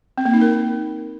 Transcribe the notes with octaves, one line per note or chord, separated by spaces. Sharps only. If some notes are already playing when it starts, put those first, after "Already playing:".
C4
A#3
D#4
A#4